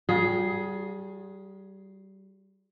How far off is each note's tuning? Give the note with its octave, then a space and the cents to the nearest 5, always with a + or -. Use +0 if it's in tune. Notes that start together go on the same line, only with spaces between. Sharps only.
G3 -25 F4 +45 G#4 +10